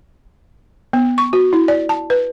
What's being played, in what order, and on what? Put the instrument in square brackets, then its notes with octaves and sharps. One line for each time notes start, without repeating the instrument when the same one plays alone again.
[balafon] B3
C#6
F#4
E4
D5
A5
B4